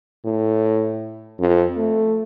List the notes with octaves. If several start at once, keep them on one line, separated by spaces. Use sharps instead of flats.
A2
F2
A3